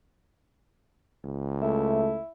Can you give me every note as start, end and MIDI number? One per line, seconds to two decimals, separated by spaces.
1.25 2.19 37
1.61 2.19 57
1.61 2.32 64